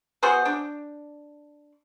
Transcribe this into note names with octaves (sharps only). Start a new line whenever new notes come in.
B3 F#4 G#4 C5
D4